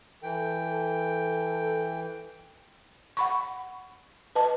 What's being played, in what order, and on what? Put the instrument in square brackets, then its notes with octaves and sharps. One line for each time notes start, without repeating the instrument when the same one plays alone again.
[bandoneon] E3 G5 [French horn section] A4
[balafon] F#5 B5 C#6
B4 D#5 A5